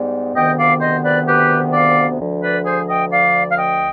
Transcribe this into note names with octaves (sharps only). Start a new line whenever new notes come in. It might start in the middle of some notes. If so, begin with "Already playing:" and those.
Already playing: G#2 G3 B3
D2 C3 D#3 B3 D#5 G5
D5 F5
C5 D#5
B4 D5
G4 B4
D5 F5
D2 D3 F3
B4 D5
G#4 C5
D#5 G5
D5 F5
F5
D#5 G5